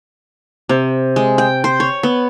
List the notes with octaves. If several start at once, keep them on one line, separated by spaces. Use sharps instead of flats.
C3
G#3
G5
C5
C#5
B3